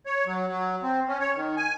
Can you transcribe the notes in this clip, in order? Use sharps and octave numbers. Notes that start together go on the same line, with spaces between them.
C#5
F#3
F#3
C4
C#4
C#5
D#3
G#5